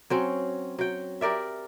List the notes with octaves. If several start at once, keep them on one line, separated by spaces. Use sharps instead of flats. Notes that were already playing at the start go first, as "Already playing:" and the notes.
F#3 C4 C#4
F#3 G5
G4 A#4 D5 E5